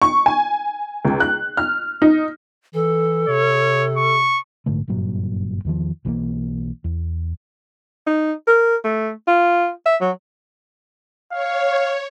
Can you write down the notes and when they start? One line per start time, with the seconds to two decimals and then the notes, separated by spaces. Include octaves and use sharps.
0.02 C#6
0.26 G#5
1.05 C#2
1.20 F#6
1.57 F6
2.02 D#4
2.74 E3 A4
3.28 C3 C#5
3.97 C#6
4.66 A#1 G#2 D3 A3
4.88 F#1 G2 A#2 F#3
5.65 E2 D#3 F3
6.05 B1 E3 F#3 A#3
6.84 E2
8.07 D#4
8.48 A#4
8.84 A3
9.27 F4
9.86 E5
10.01 F#3
11.31 C#5 F5